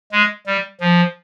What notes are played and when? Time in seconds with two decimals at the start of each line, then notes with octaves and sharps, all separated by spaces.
0.12 G#3
0.47 G3
0.81 F3